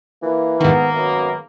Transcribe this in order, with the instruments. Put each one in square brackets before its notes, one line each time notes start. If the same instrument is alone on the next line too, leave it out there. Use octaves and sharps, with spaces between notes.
[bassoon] E3 [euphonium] A#3
[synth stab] G#2 D#3 [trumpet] A#3 [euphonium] B3
[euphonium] F#2 [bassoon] B3